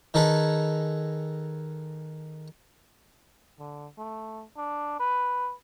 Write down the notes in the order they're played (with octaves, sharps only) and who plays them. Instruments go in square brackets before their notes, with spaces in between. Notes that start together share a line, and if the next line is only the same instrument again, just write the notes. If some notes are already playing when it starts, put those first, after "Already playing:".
[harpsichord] D#3 D#4 G#4 A4 B4
[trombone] D3
A3
D4
B4